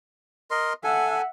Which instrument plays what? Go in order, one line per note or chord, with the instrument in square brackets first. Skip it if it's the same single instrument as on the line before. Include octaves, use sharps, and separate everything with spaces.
[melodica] A#4 D#5 C6
[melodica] A4 G#5 [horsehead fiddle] E5 F#5